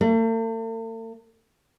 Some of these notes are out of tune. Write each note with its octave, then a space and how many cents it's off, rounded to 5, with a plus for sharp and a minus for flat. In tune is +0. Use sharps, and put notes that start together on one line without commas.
A3 +45